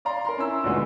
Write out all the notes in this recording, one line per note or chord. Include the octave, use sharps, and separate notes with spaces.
D5 F5 A#5 C6
A#4 A#5 C6
C#4 E4 E6
D2 A#2 D3 G#3 B3